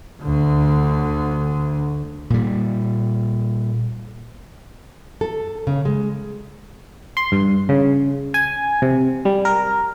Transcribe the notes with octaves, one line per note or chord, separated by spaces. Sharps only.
D2 D3
A#2 G3
A4
C#3
G#3
C6
G2
C#3
G#5
C3
G3
A#4